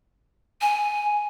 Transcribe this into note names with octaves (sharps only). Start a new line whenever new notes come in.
G#5